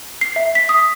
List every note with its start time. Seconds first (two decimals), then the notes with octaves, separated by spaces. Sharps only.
0.21 C7
0.36 E5
0.55 B6
0.69 D#6